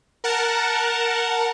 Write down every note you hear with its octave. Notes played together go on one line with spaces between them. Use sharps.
A#4 F#5 A5